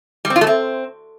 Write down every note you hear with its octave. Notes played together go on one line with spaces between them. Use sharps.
G3
C4
F4
A3
C4